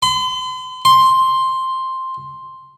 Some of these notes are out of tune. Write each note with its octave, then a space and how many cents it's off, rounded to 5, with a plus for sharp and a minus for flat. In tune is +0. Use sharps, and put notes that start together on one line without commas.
C6 -45
C6 +5